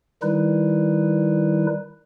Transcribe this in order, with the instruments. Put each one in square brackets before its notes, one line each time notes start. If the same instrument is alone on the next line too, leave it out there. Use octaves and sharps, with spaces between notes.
[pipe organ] D#3 G3 D#4 E4 B4